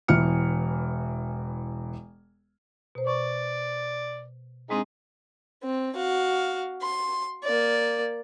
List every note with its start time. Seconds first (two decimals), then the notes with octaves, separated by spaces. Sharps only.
0.08 E1 E3 F6 C#7
2.95 B2 C5
3.07 D5 C#6
4.70 G#3 C4 D4 D#4 G#4
5.63 C4
5.96 F#4 F5
6.82 C6
7.44 A#3 D5